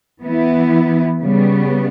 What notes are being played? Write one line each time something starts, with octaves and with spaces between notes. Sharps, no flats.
E3 B3 E4
C#3 G3 B3